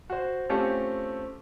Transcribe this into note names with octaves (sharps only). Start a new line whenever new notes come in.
F#4 C5
A3 C4 C#4 F4 G4 A4